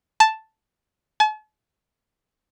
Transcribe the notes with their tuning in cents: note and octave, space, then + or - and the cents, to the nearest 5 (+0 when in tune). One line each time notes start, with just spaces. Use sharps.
A5 +0
A5 -45